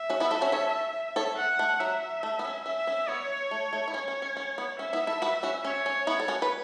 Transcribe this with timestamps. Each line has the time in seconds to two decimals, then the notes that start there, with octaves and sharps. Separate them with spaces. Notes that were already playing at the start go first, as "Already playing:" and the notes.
Already playing: E5
0.10 C#4 F#4
0.20 B3 E4
0.31 E4 A4
0.41 C#4 F#4
0.52 A4 C#5
1.16 A4 C#5
1.38 F#5
1.59 A3
1.80 F#3 E5
2.23 A3
2.39 B3
2.45 C#4
2.65 C#4 E5
2.87 C#4
3.08 B3 C#5
3.51 A3
3.73 A3
3.88 E4
3.94 C#4 C#5
4.08 C#4
4.22 C#4
4.37 C#4
4.58 B3
4.79 C#4 E5
4.93 B3 E4
5.07 E4 A4
5.22 F#4 B4
5.43 C#4 F#4
5.64 C#4 C#5
5.86 C#4
6.07 B3 E4
6.20 A4
6.28 C#4 F#4
6.42 B4